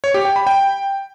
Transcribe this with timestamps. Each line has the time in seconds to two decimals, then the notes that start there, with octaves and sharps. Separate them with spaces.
0.04 C#5
0.14 G4
0.25 G5
0.36 B5
0.47 G5